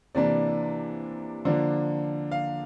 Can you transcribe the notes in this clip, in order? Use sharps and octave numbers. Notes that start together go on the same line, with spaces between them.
C3 E3 A#3 D4 D5
D3 F3 A#3 D4
F5